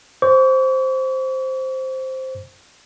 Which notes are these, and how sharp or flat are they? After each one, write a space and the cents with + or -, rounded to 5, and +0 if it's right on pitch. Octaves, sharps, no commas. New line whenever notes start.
C5 +0 C#6 +45